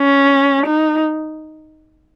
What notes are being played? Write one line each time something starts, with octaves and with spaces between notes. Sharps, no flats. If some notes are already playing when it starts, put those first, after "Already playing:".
Already playing: C#4
D#4